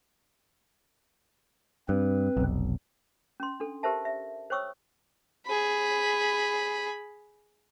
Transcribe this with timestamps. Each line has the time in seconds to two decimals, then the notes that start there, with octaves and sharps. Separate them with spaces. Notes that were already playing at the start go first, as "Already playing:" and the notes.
1.89 G2 C4 B4
2.37 F1 B1
3.40 C#4 C6
3.60 D4 A4
3.83 G4 A#4 C5 E5 A5
4.05 E5
4.50 C5 C#5 G5 C#6 D#6 E6
5.46 G#4 B5